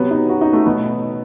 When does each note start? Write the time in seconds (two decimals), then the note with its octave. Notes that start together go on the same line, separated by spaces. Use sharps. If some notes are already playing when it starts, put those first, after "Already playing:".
Already playing: C3 F#3 B3
0.11 D#4
0.29 F#4
0.41 D#4
0.53 A3
0.66 B2 F#3 B3